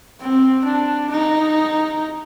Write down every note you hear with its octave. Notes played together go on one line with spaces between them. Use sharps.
C4
D4
D#4